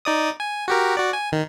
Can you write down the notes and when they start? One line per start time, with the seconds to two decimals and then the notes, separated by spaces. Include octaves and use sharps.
0.05 D#4 D5 D#6
0.40 G#5
0.68 F#4 G4 A#4
0.97 F#4 D5
1.13 G#5
1.32 D#3